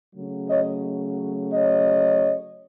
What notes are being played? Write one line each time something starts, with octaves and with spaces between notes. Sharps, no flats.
C#3 F#3 A3
C#5 D#5
C#5 D#5